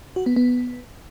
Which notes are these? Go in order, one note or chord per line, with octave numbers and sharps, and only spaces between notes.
F#4
B3
B3